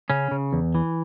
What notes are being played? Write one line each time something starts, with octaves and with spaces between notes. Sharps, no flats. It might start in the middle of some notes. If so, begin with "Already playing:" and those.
C#3 C#4
C#3
E2
E3